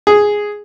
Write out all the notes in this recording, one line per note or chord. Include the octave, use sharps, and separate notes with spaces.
G#4